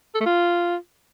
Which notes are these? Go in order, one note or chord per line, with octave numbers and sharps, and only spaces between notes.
A4
A3
F4